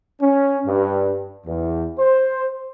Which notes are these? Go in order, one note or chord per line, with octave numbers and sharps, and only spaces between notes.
C#4
G2
E2
C5